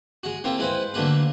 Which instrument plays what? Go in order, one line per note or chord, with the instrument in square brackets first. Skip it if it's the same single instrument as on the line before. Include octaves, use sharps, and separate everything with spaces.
[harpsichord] G#3 F#4
A#3 C4 E4 F4
G#3 E4 B4 C5
D3 F#3 A3 A#3 B4